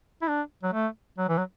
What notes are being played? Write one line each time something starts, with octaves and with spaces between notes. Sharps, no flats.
E4
D4
F#3
A3
F#3
E3
F#3